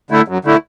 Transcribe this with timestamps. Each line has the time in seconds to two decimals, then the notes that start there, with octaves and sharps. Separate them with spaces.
0.11 D3 A3 E4
0.28 F#2
0.45 D3 A3 E4